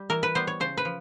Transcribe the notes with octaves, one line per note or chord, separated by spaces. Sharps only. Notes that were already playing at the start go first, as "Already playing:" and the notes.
Already playing: G3
E3 A#4
B4
G3 B3 C5
C#5
C#3 C5
B4
F3